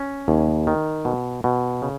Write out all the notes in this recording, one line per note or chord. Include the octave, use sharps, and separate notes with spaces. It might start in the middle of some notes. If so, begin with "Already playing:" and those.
Already playing: C#4
D#2
D#3
B2
B2
C#3